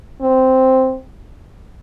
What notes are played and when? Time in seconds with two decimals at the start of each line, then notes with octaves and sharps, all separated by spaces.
0.21 C4